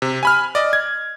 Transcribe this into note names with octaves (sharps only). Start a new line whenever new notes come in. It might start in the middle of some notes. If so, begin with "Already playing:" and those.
C3
G#5 B5 F6
D5 D#5
G#6